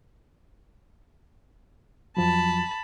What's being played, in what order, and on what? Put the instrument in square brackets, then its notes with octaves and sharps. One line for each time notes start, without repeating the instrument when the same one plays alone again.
[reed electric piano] F2 F3 F#3 [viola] A5 B5